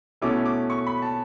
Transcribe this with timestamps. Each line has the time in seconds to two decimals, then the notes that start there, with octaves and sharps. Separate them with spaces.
0.22 B2 A3 C#4 E4 D6
0.45 D6
0.70 C#6
0.87 B5
1.02 A5